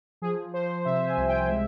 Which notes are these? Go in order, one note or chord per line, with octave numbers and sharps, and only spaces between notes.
F3 G#4
F3 C5
C3 E5
G#5
C2
G5
G#3 E5